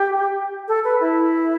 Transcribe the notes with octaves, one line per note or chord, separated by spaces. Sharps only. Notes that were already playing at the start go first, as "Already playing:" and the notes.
Already playing: G4
A4
B4
E4